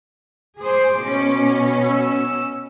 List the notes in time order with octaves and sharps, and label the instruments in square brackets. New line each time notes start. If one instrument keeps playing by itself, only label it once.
[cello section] G#4 C5 [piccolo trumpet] D6
[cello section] B2 C#4
[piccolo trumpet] E6